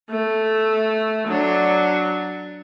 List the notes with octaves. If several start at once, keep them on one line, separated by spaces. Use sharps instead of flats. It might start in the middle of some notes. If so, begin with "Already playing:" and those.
A3
F#3 D4